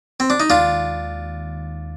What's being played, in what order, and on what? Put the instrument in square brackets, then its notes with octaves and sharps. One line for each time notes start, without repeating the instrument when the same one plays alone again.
[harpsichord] C4
D4
D#4
[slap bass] D#2 D#3 G#3 [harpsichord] D4 F4